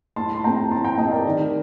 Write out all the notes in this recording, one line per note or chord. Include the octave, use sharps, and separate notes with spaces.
A2 A5 C6
C6
A3 C4 G5 A#5
A2 A5 C6
G5 A#5
A3 C4 D#5 G5
A#4 D5
D#3